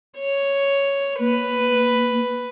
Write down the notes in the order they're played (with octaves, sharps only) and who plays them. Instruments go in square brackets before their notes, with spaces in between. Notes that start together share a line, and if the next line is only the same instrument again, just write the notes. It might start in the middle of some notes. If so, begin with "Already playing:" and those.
[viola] C#5
[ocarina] A#3 [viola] B4